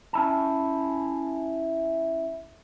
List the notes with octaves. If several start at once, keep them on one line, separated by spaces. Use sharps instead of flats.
C#4 E4 A5